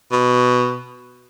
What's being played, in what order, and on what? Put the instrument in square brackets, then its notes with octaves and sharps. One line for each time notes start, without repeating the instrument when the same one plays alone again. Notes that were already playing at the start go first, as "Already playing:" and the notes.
[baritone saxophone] B2